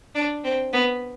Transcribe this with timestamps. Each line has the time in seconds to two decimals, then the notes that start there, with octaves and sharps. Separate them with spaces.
0.15 D4
0.44 C4
0.73 B3